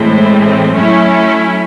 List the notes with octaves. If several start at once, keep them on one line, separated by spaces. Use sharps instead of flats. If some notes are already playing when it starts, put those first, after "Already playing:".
Already playing: A2 E3 G#3 C4
F#3 A3 C#4 E4